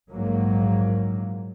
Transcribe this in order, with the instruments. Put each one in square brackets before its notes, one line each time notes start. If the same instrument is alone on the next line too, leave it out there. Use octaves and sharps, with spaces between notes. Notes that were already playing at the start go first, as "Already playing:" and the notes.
[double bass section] A#1 G#2 F#3 A#3